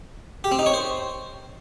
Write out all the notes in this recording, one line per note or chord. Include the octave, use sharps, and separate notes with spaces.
G4
C4
D#4
C#5
C5